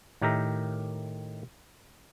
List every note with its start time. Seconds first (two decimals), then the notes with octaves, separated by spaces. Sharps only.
0.22 A2 D#3 G4 A#4 E5 A#5